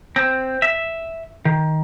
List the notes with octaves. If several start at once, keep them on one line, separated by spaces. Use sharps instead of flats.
C4
E5
D#3